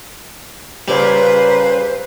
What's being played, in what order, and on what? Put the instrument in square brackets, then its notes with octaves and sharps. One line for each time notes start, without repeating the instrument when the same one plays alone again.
[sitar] A#2 C#3 [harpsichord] G3 [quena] B4 [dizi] C5